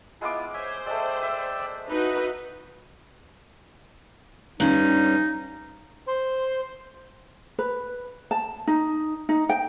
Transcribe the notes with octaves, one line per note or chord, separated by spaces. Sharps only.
G#3 B3 E4 F4 D6
C5 C#5 E5 G#5
G#3 A3 D5 G5 E6
E5
D#4 E4 F#4 B4
G2 C#4 D#4
C5
B4
A5
D#4
D#4
G5